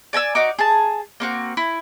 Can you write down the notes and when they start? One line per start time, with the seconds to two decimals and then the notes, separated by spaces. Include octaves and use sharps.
0.13 D5 G#5 A#5 E6
0.35 D#4 F#4 D6
0.59 G#4 A5
1.20 A#3 C4 F#4
1.57 E4